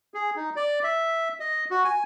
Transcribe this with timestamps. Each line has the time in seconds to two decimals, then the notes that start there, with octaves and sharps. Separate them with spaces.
0.14 G#4
0.36 D#4
0.56 D5
0.84 E5
1.40 D#5
1.71 F#4
1.85 G#5